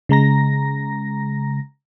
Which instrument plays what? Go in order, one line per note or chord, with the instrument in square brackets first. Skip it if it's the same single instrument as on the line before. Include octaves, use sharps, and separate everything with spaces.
[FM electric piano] C#3 G#3 A#5 A#6